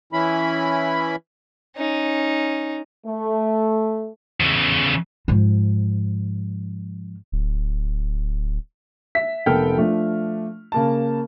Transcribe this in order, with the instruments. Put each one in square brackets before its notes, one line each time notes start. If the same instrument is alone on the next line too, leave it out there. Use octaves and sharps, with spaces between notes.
[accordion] E3 C#4 E4 B5
[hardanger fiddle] C#4 D#4
[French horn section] A3
[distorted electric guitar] E2 C#3
[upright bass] G#2 F3
[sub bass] D1
[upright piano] E5 B6
F1 B3 A4 A#4 G5 F6
F3 A3 D4
C#3 A#3 A5